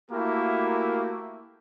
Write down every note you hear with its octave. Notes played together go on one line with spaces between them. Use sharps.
A3 A#3 E4 F#4 G4 A#4